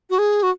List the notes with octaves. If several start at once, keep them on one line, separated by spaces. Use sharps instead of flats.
F#4
G#4
F#4